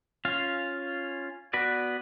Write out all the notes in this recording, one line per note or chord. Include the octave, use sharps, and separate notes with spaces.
C#4 F4 F5
B3 F#4 B4 D5